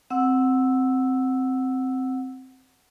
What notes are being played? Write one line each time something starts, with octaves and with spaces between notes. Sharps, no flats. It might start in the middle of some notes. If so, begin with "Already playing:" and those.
C4 F#5 E6